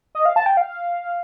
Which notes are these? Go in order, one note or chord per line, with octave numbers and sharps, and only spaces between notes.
D#5
F5
A5
G5
F5